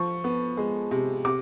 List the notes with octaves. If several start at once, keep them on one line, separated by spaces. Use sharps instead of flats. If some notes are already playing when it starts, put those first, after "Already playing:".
Already playing: F3 C#6
B3
G#3
C3
C3 D6